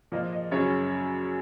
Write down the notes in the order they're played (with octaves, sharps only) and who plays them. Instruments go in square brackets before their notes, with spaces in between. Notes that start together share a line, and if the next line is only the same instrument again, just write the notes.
[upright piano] A#2 F3 A#3 D#5
D#5
F#2 C#3 F#3 C#4 C#5